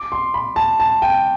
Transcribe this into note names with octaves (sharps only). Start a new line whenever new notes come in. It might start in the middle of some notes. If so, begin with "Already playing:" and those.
Already playing: D6
C6
B5
A5
A5
G5